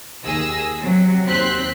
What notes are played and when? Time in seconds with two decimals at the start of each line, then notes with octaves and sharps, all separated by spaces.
0.23 D#2 G#4 E6 A#6
0.81 C3 F#3
1.28 D#2 C4 C6 F#6 B6